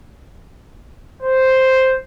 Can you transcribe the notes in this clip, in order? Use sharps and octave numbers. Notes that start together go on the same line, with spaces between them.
C5